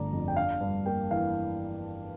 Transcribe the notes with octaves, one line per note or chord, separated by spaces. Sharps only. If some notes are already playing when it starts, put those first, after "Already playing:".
Already playing: G1 D3 A3 D5 A#5
F2
G5
D4 F5
G2
A#3 G5
E3 F5